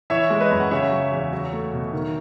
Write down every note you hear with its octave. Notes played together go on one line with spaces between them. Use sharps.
E3 C#5 E5
G#3
B4 D#5
F#2
F#5
C#3 C#5 E5
F#3
E2
F#3
A3
B2
D#3